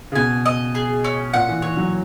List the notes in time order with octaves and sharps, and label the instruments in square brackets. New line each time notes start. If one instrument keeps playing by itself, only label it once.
[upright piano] C#3
[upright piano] B2 [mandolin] G#5
[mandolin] D#5
G#4
C#4
[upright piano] A#2 [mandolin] F#5
[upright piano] E3
[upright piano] E3 [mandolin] C#5
[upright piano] F#3